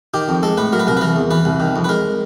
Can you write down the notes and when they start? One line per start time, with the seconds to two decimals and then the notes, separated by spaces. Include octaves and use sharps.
0.14 D#3 G4
0.29 F2
0.43 G#3 A4
0.57 A2 B4
0.73 F#3 A#4
0.79 B4
0.87 C2 A#4
0.97 B4
1.01 E3 A#4
1.16 E2
1.31 E3 B4
1.45 C2
1.60 D#3
1.76 F2
1.84 B4
1.89 G#3 A#4